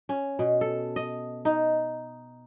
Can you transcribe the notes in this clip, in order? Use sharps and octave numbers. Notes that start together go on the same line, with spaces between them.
C#4
B2
A4
D#5
D#4